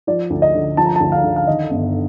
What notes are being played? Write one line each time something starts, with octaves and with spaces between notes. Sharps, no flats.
F3 D5
D2
D#5
D3
F3 A5
A#5
D2 A5
F5
D3
F5
D#3 D#5
G1